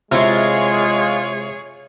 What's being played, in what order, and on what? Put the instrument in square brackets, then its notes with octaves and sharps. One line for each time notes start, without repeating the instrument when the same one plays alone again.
[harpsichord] C3 E4 [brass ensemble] G#3 [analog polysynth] F4 [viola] G#4 C#5